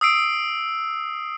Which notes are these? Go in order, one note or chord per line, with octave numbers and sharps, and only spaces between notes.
D#6 E6 C7 D7